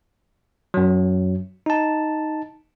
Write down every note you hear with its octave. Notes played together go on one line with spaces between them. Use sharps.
F#2 F#3
D#4 A5